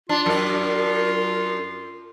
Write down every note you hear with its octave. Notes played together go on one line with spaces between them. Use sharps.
D4 F4
F#2 A#4 D5